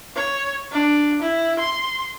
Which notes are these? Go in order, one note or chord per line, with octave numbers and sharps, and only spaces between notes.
C#5
D4
E4
C6